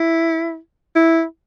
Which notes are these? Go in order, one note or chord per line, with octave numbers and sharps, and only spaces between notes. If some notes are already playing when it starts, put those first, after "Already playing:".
Already playing: E4
E4